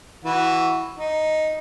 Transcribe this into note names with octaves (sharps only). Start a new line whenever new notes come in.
E3 F#4
D#4